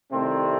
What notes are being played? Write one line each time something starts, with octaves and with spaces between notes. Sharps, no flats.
C2 C3 D#3 A3 C4